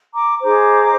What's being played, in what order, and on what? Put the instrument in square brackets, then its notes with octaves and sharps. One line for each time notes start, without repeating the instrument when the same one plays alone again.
[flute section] A#5 D6
D#4 G#4 C5 A#5 D6